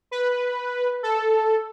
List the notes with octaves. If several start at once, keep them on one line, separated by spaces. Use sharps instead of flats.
B4
A4